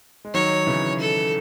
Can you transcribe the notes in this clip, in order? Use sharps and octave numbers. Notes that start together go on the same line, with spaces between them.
G#3
D#3 F#3 C#5
C#3 E3
A4